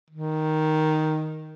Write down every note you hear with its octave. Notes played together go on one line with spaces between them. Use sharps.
D#3